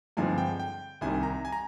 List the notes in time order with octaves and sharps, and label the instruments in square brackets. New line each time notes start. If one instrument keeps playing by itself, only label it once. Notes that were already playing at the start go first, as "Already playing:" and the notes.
[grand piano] G2 D3 F3 G#3 C4 [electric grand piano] G#5
[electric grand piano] G5
G5
[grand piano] C2 C3 D#3 G3 [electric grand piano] G#5
[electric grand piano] A#5
G#5
A#5